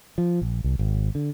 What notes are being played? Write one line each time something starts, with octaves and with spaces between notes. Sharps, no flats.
F3
A#1
C2
G#1
D3